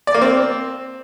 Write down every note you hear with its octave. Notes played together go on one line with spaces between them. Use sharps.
D5
A#3
C4